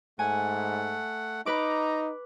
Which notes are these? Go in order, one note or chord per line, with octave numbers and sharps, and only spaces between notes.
G#2 A3 F#5 G#5
D#4 B4 A#5 D6